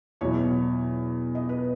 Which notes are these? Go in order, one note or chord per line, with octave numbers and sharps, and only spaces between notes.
E2 B2 F#3 C#5
D#5
B4